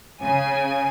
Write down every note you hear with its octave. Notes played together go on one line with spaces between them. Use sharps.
C#3 G#5